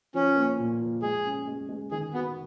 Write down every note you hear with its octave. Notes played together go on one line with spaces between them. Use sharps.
F3 C#4
A#3
A#2
F3
G#3 G#4
C#4
G#3
G#3
D#3 G#4
B3 F#4